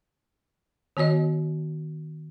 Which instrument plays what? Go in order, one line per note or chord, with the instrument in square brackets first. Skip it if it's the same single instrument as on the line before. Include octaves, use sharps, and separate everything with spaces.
[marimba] D#3 B3 F#4 C#5 D#5